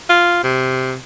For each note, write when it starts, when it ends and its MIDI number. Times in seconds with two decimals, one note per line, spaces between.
0.10 0.42 65
0.44 0.96 48